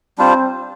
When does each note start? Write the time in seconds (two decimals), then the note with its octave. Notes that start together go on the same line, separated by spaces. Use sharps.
0.18 G3 C4 D4 F4 C5